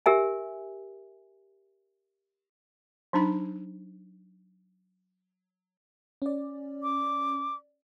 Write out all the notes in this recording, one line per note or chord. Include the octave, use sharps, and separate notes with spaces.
G4 A#4 E5 G#5
F#3 D4 D#4 B5
C#4 D5
D6